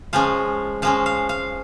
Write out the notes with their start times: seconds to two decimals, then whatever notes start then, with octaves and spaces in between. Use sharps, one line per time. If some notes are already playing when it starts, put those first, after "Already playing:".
0.13 F3 G#3 C#4 F5
0.82 F3 G#3 C#4 F5
1.06 F5
1.29 F5